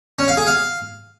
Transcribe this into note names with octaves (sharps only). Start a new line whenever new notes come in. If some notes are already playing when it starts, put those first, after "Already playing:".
C#4
F5
G#4
F5